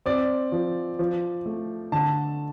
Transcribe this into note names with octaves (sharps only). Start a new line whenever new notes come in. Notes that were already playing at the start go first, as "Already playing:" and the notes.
C4 D5
F3
F3
A3
D3 A5